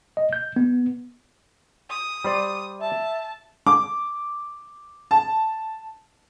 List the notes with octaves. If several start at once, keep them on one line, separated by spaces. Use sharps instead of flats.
D#5
G6
B3
D#6
G3 C5 D5
E5 A5
D6
A5